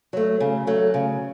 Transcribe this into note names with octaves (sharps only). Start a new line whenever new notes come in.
F#3 A3
C#3
F#3 A3
C#3